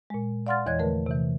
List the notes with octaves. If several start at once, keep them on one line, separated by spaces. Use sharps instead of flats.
A#2 G#3
D5 F5 F#5 C6 F6 A6
E2 E3 C#5 D#5 F#6 G#6
D3 F3 A3 A#4 B4
C3 E3